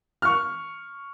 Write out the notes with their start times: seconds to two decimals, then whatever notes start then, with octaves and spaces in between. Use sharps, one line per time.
0.22 C#6 F6